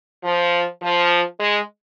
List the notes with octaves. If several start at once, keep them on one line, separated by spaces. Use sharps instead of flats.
F3
F3
G#3